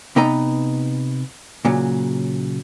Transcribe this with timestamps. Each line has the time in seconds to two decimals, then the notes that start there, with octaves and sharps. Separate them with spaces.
0.16 C3 B3 D#4 B4 D#5 A#5
1.65 A#2 C#3 F#3